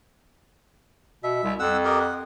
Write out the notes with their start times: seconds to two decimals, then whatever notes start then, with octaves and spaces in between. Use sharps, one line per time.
1.24 B2 E5
1.44 C2
1.59 F2 F#5 E6
1.85 G4 A#4 D#5
2.00 F#5